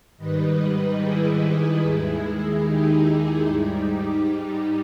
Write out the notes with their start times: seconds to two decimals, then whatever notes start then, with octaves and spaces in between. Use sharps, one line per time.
0.17 G#2 D#3 G3 B4 D#5
0.99 E4 G#4
1.82 D#2 D#3 G#3
2.64 D#4 G4
3.47 G#2 G3
4.29 D#4 G4